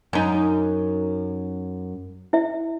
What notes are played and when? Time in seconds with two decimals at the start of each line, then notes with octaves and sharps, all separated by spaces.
0.13 F#2 D#4
2.33 E4 E5